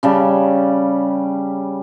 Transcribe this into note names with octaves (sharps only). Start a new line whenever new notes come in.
C#3 G3 A5